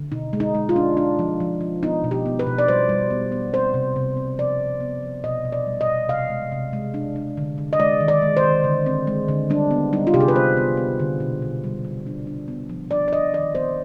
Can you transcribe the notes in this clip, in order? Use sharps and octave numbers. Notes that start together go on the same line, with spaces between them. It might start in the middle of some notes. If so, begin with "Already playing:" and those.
Already playing: D3
B2 D#4
G#3
D#4
G#3
F4
D4
D4
F3
F3
F3
B3 D#4
B2
G4
B3
B4
B2
D5
G3 C5
G3
B3
B3
C4 C5
C3
C3
C4
F3 D5
F3
B3
F3
B2 D#5
B2
D5
G3
D#5
B2
C3 F5
G#3
C3
G#3
D4
D4
D3
D3
D#5
G#3 D5
D#3
D5
G#3
C5
D#3
D3
C4
G#3
D3
G3 D4
B3
G3 D#4
F4
C3 G4
G#4
B4
B3 C5
B3
B3
D3
B2
B2
G3
G3
D4
D4
B3
F3
D4 D5
D5
D4 D#5
D#3 D5
B3 C5